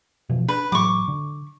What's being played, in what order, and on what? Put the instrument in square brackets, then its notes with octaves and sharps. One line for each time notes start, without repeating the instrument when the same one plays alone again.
[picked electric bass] B2 E3 F3
[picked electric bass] D4 [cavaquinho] B4
[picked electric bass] A2 E3 F#3 [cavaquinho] C#6 D6
[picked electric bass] D3